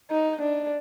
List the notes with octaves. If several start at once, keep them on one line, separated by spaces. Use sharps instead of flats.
D#4
D4